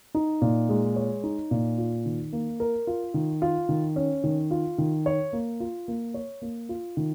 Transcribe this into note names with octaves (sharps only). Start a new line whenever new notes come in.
D#4
A#2
G#3
C#5
D#4
A#2
F4
D#3
A#3
A#4
F4
D#3
F4
D#3
C#4
D#3
F4
D#3
C#5
A#3
F4
A#3
C#5
A#3
F4
D#3